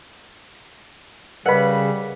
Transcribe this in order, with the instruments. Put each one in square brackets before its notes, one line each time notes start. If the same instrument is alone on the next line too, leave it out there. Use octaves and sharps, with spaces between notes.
[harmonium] C#3 [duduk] G3 [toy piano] A#4 B4 D#5 [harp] F#5 B5